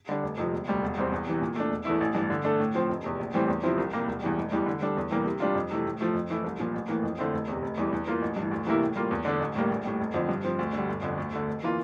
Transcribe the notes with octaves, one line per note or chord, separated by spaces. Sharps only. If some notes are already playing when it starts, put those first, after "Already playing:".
D3 G3 D4
F1
F2 C3 F3
E1
D2 C3 G3
E1
E2 C3 G3 C4
E2
C3 E3
A#2
A3 D4
E1
E2 E3 A3 E4
A1
G2 E3 G3
D3
A3 D4 A4
A2
F3 C4
F1
E2 C3
A#1
A2 E3 G3 C4
E2
C3 F3 C4 E4
C2
C3 G3 A#3
E1
E2 E3 G3
F1
E2 E3 G3
D3
G3 D4 A4
E2
C3 E3 G3 A#3
C3
G3 D4 F4
F2
C3 E3 A3
A2
F3 A3
F2
E3 A3 E4
C2
A#2 F3
A1
A2 E3 A#3
F2
D3 A3 C4 E4
F1
E2 C3
F1
E2 E3 G3
E2
E3 A#3 F4
A1
G2
E3
D2
C3 E3 A#3 E4
A2
G3 A#3 F4
E2
D3 A3 D4
A1
A2 G3 A#3
A#1
A2 G3
F1
F2 D3 F3 C4
G2
F3 C4
D2
D3 G3
G1
F2 D3
D2
D3 A3
F1
E3 A#3 F4